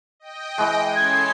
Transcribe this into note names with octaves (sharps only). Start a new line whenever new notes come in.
D#5 G5
E3 G#3
C#4 A4 G#6 C7